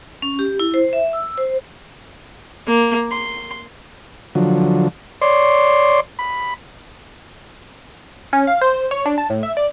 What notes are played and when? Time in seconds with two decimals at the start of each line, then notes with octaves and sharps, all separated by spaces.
0.22 C#4
0.39 G4
0.60 E4
0.74 C5
0.93 E5
1.13 E6
1.38 C5
2.67 A#3
3.11 C6
4.35 D3 F3 F#3
5.22 C#5 D5 C6
6.19 B5
8.33 C#4
8.47 F5
8.61 C5
8.91 C#5
9.06 D4
9.18 A5
9.30 A2
9.43 E5
9.57 D5